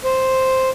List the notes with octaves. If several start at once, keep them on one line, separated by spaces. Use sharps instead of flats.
C5